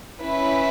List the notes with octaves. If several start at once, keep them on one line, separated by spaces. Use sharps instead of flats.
C#4 E4 B4